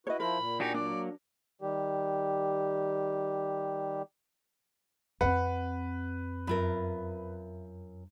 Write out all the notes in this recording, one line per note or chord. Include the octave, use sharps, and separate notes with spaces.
E4 F#4 B4 C#5 D#5
F3 E4 A#4 C5 B5
A#2
D4 D#4 F#4 G4 G#5
F#3 A#3 D4 D5
D#3 G3 G4
F2 C4 B4 F#5
F#2 F4 A#4 E5 B5